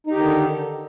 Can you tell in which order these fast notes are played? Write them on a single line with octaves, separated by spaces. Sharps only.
D#4 G4 D#3 D3